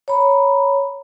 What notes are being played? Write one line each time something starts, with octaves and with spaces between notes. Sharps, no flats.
C#5 A#5 B5